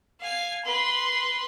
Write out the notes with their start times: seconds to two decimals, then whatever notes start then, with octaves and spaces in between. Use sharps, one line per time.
0.20 F5 G#5
0.65 B4 C6